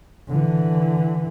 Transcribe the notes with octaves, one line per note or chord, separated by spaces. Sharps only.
D3 E3